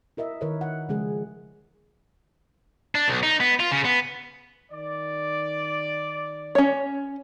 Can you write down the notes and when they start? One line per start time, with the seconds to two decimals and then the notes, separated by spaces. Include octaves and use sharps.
0.17 E4 A#4 D#5 E5
0.41 D#3 E4 A#4 B4 C#5 E5
0.61 F#5
0.89 C#3 F3 G#3 G#4
2.95 D4
3.08 B1
3.23 D#4
3.40 B3
3.60 F4
3.72 C#3
3.85 B3
4.72 D#3 D5
6.55 C#4 C#5